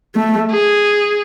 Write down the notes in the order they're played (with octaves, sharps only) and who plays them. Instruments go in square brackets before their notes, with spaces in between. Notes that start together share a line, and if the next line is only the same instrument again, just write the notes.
[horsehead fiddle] A3
[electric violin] G#4